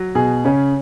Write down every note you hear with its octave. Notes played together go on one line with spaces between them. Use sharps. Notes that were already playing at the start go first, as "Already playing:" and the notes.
Already playing: F#3
B2 G#4
C#3 C#4